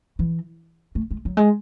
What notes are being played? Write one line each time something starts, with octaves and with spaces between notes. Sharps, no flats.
E3
A3
G#3
F#3
G#3